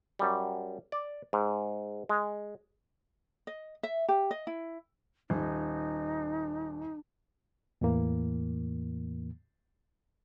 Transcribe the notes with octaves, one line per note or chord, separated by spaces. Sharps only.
F#2 G3
D5
G#2
G#3
D#5
E5
G4
D#5
E4
D#1 D#4
E2 A2 E3 A#3